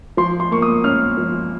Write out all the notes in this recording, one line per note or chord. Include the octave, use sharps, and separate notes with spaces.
F3 C6
C6
A#3 C#6
D#6
C#4 F6
F3